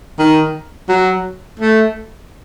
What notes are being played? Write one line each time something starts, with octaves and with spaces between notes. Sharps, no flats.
D#3
F#3
A3